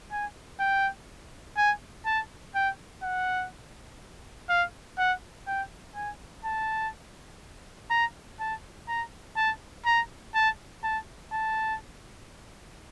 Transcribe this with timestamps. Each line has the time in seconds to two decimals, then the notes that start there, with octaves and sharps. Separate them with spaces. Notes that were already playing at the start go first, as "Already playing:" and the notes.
0.11 G#5
0.60 G5
1.57 G#5
2.06 A5
2.55 G5
3.03 F#5
4.49 F5
4.98 F#5
5.47 G5
5.95 G#5
6.45 A5
7.90 A#5
8.40 A5
8.88 A#5
9.36 A5
9.86 A#5
10.34 A5
10.84 A5
11.32 A5